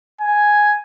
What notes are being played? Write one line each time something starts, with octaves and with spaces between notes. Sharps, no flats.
G#5